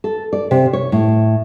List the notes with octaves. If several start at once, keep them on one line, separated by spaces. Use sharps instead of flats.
A4
D5
C3
C#5
A2